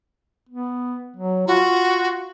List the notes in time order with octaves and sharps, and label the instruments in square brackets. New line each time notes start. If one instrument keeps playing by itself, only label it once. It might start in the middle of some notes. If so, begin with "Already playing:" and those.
[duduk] B3
F#3
[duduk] F4 [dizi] F#4